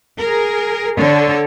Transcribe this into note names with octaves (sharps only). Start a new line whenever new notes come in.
G#4 A#4
D3 D4 A4 C#5